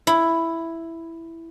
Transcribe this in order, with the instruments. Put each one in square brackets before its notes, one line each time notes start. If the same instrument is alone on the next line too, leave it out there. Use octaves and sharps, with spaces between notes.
[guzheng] E4